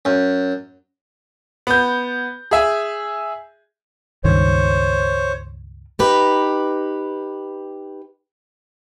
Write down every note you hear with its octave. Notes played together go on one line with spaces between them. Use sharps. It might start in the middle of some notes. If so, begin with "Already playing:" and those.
F#2
B3 G6
G#4 E5 G#5
C#2 G2 D#3 C5 C#5
D#4 G4 B4